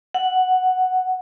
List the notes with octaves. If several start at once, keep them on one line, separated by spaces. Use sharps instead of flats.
F#5